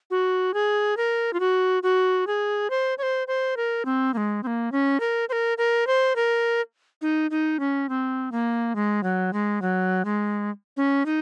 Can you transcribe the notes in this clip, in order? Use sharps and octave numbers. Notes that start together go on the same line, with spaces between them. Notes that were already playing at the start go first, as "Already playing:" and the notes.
F#4
G#4
A#4
F4
F#4
F#4
G#4
C5
C#5
C5
C5
A#4
C4
A#3
G#3
C4
A#3
C#4
A#4
C5
A#4
A#4
C5
A#4
D#4
D#4
C#4
C4
A#3
G#3
F#3
G#3
F#3
G#3
C#4
D#4